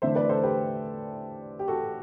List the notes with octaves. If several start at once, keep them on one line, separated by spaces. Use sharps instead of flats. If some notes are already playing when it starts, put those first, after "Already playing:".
E2 D3 A3 D4 C5 E5
B4 D5
A4 C5
G4 B4
G4
F#4 A4